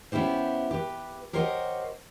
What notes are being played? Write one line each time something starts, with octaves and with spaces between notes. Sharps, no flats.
B3 C#4 E4 G4 C5
G4 B4
G4 A#4 C5 C#5 D#5 F#5